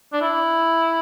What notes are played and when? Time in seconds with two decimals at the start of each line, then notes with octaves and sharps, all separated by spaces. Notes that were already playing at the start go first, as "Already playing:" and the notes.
0.13 D4
0.21 E4